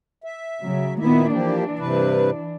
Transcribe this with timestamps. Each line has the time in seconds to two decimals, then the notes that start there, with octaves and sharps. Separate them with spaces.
0.24 E5
0.62 C#3 F#3
0.99 A#2 D#3 A#3 B3 E4 E5
1.32 E3 F3 A#3 D4 G4
1.79 G2 C3 B4